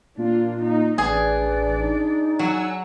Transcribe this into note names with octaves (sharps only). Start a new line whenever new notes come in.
A#2 A#3 D4 F4
D#4
A1 D4 G#4 B4 D5
D#4
F#3 F#5 G#5 E6